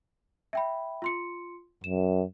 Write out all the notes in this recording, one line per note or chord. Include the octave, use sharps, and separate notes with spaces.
E5 G5 B5
F4 C6 C#7
F#2 E7